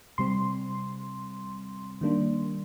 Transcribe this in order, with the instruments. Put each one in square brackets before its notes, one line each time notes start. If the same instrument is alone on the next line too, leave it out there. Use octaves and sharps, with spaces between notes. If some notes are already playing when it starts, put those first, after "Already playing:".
[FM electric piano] C3 G3 C4 C6
D#3 G3 A#3 D4